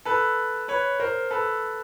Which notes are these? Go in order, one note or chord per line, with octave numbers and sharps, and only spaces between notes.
A4 B4
B4 C#5
A#4 C5
A4 B4